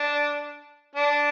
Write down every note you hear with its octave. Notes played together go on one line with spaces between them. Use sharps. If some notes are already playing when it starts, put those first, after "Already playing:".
Already playing: D4
D4